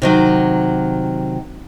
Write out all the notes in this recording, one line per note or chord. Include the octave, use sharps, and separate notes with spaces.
C3 D#3 F#3